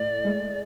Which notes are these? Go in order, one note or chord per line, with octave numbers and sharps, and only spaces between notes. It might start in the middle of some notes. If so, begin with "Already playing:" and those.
Already playing: A2 D5
G#3